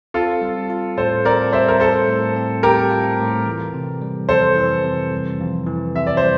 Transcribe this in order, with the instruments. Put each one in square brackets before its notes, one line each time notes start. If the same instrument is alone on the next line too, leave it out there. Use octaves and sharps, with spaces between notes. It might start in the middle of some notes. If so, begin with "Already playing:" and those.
[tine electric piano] C4 [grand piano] F4 A4
[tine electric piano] G3
F4
[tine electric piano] A2 [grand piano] A4 C5
[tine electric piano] C4 [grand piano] A#4 D5
[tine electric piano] G3 [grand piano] C5 E5
[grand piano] A#4
[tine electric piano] F4 [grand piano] A4 C5
[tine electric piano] A2
C4
[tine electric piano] G3 [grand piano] G4 A#4
[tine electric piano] F4
A2
E3
C3
G3
[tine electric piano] F2 [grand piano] A4 C5
[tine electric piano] E3
C3
G3
F2
E3
[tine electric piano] C3 [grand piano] E5
[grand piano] D5
C5
[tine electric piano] G3